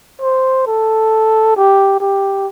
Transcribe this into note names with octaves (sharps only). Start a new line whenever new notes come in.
C5
A4
G4
G4